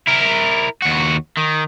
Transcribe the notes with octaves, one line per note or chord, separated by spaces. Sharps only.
E4 A#4
D#2 F#4
D#3